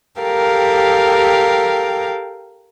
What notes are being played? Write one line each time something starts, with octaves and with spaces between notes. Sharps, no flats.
G4 A4 A#4 F5 G5